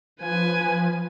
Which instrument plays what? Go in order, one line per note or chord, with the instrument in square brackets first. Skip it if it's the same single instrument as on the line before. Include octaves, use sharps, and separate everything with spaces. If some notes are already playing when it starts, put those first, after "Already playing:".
[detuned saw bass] F3 [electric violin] B4 G#5